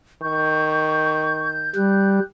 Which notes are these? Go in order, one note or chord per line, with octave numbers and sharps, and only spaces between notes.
D#3 C#6 G6
G3 F#6